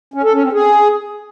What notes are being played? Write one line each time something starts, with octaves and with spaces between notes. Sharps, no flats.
C#4
A4
C#4
C4
G#4